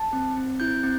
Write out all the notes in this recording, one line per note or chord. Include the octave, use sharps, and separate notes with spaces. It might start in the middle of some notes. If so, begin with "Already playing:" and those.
Already playing: A5
C4
C4
E4 G6
C4